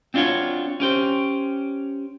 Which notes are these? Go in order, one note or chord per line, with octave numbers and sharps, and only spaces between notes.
C4 D4 F4 F#4 C#5
C#4 G4 C5